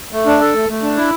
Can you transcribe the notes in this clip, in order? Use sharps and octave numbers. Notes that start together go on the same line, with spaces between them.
A3
D4
A4
A3
A3
D4
E4